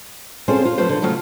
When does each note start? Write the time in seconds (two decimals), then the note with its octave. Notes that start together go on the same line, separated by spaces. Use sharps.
0.48 C4 C#4 F4 G#4 A4 C5
0.65 F4
0.78 F3 F#3 A3 B4 C5
0.89 D3
1.02 C#3 F#3 A3 B3 C#4 F4